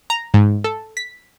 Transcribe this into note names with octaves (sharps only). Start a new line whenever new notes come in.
A#5
G#2
A4
B6